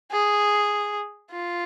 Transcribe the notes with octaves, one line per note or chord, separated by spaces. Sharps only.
G#4
F4